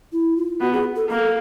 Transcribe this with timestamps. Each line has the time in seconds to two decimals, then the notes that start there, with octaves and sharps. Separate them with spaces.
0.12 E4
0.37 F4
0.61 B3 F#4
0.73 G#4
0.96 A4
1.09 A#3 A4